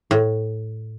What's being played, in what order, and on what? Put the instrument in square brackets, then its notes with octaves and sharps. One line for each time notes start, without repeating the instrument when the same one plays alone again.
[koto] A2